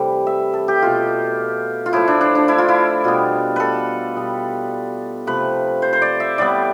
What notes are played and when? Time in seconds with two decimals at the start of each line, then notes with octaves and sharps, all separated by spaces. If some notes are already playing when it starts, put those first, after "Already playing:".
Already playing: C3 E3 G3 A3 E5
0.27 E5
0.53 A4
0.68 G4
0.82 B2 A3 F4
1.86 F4
1.93 A2 F3 A3 E4
2.08 D4
2.21 D4
2.35 D4
2.48 E4
2.58 F4
2.68 E4
3.04 B2 G3 B3 F4
3.56 A4 B4
4.16 B2 G3 B3
5.27 C3 F3 A3 B4
5.82 C5
5.93 C5
6.02 D5
6.20 E5
6.38 A2 G3 B3 D5